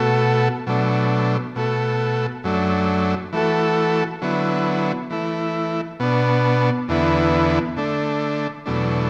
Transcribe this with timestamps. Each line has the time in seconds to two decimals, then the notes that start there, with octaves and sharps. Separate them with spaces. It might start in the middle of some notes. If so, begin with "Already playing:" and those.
Already playing: B2 A3 F#4 A4
0.67 B2 F#3 A3 D4
1.56 B2 A3 F#4 A4
2.44 F#2 F#3 A3 D4
3.33 E3 A3 F#4 A4
4.22 D3 F#3 B3 E4
5.10 E3 A3 E4
6.00 B2 B3 D4
6.88 E2 D3 B3 E4
7.77 D3 A3 D4
8.66 E2 B2 F#3 A3 D4